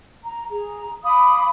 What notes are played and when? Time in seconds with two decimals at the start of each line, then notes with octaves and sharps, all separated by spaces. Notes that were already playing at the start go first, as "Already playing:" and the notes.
0.24 A#5
0.50 G#4 A#5
1.03 F5 B5 D6 D#6